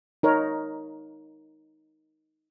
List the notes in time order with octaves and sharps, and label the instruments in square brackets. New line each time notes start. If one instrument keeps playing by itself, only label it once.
[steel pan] D#4 A#4 C#5